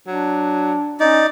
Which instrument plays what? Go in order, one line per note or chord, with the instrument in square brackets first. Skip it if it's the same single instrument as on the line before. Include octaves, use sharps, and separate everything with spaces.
[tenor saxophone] F#3 [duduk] D4
[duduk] C#4 [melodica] D#4 [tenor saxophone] D5